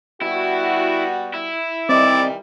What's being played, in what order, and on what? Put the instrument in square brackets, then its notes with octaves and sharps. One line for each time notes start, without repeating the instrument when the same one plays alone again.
[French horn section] G3 B3 F#4 [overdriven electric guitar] E4
[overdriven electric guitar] E4
[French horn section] D#3 E3 G3 [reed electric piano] C4 D#5 D6 [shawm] D5